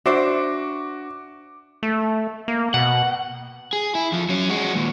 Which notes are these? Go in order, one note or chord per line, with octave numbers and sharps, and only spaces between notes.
D4 F#4 C5 E5 D6
A3
A#3
B2 F#5
G#4
E4
F2 F3
F#3 C#4
G#3 F#4
D#2 A#2